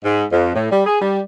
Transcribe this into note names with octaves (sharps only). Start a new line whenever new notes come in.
G#2
F2
A2
G3
G#4
G3